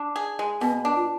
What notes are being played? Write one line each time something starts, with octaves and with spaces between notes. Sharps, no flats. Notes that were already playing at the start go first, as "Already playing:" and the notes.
Already playing: D4
G#4
G#3
B2 B3
D4
F4